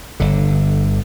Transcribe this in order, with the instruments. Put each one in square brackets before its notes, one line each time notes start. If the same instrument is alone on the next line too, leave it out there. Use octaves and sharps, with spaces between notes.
[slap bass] G1 D3